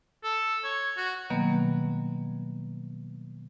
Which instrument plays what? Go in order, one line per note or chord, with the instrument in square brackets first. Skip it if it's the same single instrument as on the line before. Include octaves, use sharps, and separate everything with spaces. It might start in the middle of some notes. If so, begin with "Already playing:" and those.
[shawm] A4
C#5
F#4
[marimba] B2 D#3 F#3 G3 A#3 B3